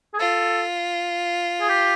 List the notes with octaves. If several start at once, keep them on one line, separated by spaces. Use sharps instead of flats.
G#4
F4 A4
G#4
G4